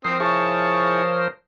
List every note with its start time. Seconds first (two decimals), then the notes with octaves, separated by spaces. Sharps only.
0.05 F3 C4 A#4 C5 D#6 C7
0.20 E4 G#4 C#5 A5 C#6 D#6